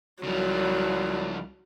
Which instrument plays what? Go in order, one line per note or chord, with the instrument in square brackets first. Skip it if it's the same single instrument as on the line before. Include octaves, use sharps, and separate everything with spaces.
[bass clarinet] C2 [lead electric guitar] C#3 F3 [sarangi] F#3